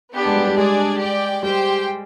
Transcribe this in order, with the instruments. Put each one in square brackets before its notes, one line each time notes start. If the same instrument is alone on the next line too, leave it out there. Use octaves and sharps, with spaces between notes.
[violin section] B3 D4 G4
[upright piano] G#3
G3
G3
[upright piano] G#3 [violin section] D4 G#4 D5
[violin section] G4 D5 G5
[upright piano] G3 [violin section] G4 C5 G5